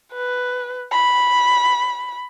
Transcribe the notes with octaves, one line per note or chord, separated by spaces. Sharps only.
B4
B5